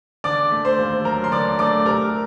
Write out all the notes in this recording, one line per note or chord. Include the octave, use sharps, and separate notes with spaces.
D3 D5 D6
A3
C5 C6
D#2
F#3 A#4 A#5
C6
D3 D5 D6
A3 D5 D6
C3 A#4 A#5